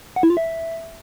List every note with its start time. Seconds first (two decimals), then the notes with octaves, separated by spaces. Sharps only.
0.16 F#5
0.23 E4
0.30 F4
0.37 E5